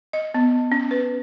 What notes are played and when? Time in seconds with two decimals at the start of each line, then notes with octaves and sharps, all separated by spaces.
0.13 D#5
0.34 B3
0.72 C#4
0.91 B4